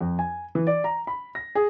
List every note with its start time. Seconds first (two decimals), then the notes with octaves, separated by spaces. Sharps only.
0.01 F2
0.19 G#5
0.55 E3
0.67 D5
0.84 A#5
1.07 B5
1.35 A#6
1.55 G#4